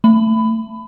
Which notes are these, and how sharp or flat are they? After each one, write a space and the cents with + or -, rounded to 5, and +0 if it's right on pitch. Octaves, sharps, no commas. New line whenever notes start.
A3 +20 B5 +20